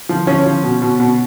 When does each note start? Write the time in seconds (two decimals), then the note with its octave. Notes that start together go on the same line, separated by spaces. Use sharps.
0.09 F3
0.27 F3 C#4
0.46 F3
0.63 B2
0.82 B2
1.00 B2